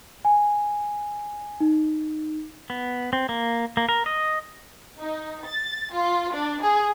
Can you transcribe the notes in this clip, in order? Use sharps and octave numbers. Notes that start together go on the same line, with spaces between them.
G#5
D#4
B3
C4
A#3
A#3
A#4
D#5
D#4
A6
F4
D4
G#4